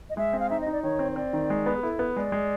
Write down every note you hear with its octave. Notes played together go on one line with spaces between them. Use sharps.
D#5
G#3 E5
C4
F5
D#4 E5
D#5
D#4
D5
D#3 C#5
C4
C#5
C4 D5
D#3
G#3
B3
G#4
E4 A4
B3
G#3 D5
G#3